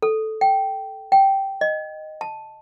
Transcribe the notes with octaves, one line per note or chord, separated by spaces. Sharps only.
A4
G5
G5
D#5
A5